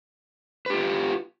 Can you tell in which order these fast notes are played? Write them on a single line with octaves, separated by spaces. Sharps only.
B4 G4 F4